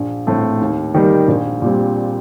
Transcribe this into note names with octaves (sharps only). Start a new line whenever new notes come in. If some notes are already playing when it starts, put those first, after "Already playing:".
Already playing: A#1
A2 A3 C4
D#2
D#3 G3 A#3
A#1
A#2 G3 C4